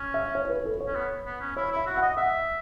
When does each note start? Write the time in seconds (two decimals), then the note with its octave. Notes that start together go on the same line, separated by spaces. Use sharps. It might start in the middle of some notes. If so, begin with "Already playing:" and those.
Already playing: C#4
0.14 E5
0.35 C#5
0.45 C#5
0.50 B4
0.65 A4
0.80 C#5
0.87 C#4
0.96 B3
1.26 B3
1.41 C#4
1.56 E4 C#5
1.72 E4 E5
1.87 F#4
1.97 F#5
2.02 D#5
2.17 E5 F#5